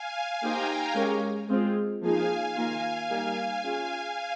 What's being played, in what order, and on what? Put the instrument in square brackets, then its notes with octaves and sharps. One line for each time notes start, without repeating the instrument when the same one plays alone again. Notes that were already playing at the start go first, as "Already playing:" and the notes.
Already playing: [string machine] F5 G#5
[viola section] A#3 D#4 G4 C5 [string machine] G5 A#5
[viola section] G#3 C#4 G4 A#4 C#5
G#3 C4 F4 G#4
[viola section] F3 A#3 D#4 G#4 [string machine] F5 G#5
[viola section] D#3 A#3 F4 A#4
G3 A#3 D#4 G4 A#4
C#4 F4 G#4